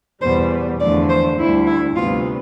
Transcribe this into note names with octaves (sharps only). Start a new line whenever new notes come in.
E2 B2 G3 B3 C5
E2 D3 F3 A3 D5
C5
D2 D3 G3 E4
E4
D2 C3 G3 B3 F4